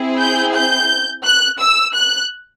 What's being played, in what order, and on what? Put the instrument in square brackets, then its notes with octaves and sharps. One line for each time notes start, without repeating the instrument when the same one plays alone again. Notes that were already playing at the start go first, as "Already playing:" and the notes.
Already playing: [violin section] C4 E4 G#4
G6
G6
F#6
E6
F#6